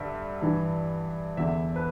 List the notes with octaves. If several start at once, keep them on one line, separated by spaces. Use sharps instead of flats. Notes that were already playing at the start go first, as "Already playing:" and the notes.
Already playing: G2 D3 E5
G2 E3
E2 D3 E5
B4